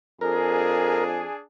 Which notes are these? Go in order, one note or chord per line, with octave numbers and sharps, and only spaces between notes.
F2 D4 G#4 A#4